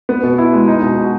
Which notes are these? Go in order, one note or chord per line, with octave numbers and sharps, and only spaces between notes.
B3
B2
E4
G#3
D#4
B2
F#4